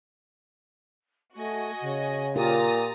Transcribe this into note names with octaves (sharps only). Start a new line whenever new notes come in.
A3 F#4 D#5 G#5
C#3
A#2 F4 G4 A#4 A#5 D#6 A6